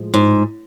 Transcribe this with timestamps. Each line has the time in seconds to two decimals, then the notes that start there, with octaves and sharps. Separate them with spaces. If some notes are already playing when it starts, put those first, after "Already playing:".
Already playing: A2 F3 G#3
0.14 G#2